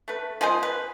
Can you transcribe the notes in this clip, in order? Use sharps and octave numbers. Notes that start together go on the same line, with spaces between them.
A3 B4
F3 G#3 G#4 C5
B4